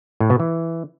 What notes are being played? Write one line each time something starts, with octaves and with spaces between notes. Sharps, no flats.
A2
B2
E3